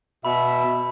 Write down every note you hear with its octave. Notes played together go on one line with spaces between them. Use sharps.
B2 E5 B5